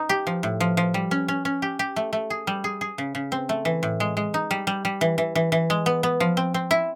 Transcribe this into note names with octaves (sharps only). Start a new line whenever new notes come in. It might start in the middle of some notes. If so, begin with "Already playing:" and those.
Already playing: D#4
G4
F3
A2
F3
F3
G3
C#4
C#4
C#4
G4
G4
A3
A3
G#4
G3
G#4
G#4
C#3
C#3
C4
A3
E3
A2
G#3
G#3
D#4
G3
G3
G3
E3
E3
E3
E3
G#3
B3
B3
F3
C4
C4
E4